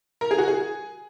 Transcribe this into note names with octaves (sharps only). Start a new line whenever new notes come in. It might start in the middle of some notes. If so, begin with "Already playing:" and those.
A#4
G#4
F#4
G#4